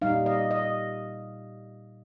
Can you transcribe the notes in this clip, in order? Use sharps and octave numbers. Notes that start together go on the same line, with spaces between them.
A#2 G3 D#4 F5
D#5
D#5